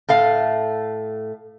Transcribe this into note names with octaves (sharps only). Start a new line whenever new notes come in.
A2 A3 F5